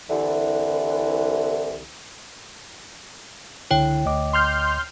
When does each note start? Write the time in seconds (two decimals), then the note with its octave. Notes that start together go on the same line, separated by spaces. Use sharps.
0.09 C2 D3 E3
3.71 C#2 D3 E4 C#5 G5
4.05 D2 D#5 D6
4.33 C6 F6 G6